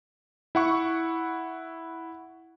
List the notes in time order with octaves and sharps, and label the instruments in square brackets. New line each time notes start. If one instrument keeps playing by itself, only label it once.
[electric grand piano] E4 F#5 C#6